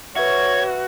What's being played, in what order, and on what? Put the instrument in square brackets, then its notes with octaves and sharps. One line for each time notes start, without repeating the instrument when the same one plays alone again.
[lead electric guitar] F#4 [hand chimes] B4 E5 [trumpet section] C#5 [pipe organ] G#6